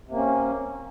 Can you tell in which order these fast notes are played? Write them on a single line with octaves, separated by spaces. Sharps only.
C3 A#3 C#4